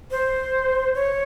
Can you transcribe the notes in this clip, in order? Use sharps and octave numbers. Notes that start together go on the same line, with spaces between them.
C5
C#5